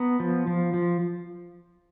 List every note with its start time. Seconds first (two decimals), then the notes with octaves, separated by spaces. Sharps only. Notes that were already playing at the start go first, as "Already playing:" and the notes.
Already playing: B3 A#5
0.20 F3
0.47 F3
0.74 F3